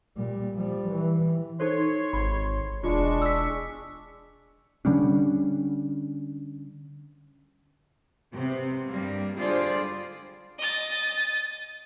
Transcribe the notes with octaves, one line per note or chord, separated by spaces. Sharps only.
A#2 G3
F3 G3
E3
D#4 A4 C5 C#5 C6
G#1 B5
E1 G#3 D4 F4 C#6
E6 B6
D3 G3 C#4 D4
C3 B3 C4
G2 G3 A#3
D3 G3 F4 G#4 C5 D5
D#5 A6